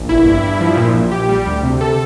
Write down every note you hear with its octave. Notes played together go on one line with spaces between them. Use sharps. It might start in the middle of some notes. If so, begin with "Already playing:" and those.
Already playing: A#1
G1 E4
G2
G2
F3
A#2
A#1
A#1 G4
G3
D2
C3
A4